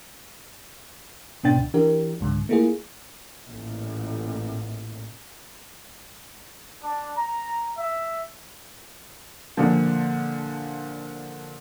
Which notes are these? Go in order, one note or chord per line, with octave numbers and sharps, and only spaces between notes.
G#2 B2 B3 D4 G5 A6
D2
E3 D4 G4 A#4
C#2 G#2 D3
A3 A#3 E4 F4 G#4
A1 A#2
D4
A#5
E5
A#2 D3 F3